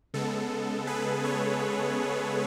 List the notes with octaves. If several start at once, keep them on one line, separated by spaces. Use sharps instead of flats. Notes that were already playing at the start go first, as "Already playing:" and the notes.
C#3 G#3 B3 A4
G#4 B4
A4 C#5